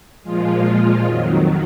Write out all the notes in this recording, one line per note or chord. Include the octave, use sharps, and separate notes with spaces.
A#2 F3 G#3 F4
F2 D#3 F#3